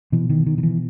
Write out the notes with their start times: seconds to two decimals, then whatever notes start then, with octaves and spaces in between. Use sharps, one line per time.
0.12 B2 E3
0.30 D#3
0.46 D#3
0.58 D#3
0.63 E3